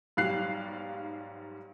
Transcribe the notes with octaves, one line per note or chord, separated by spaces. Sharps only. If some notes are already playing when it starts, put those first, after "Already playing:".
B1 G#2 G3 F5 F#6 C7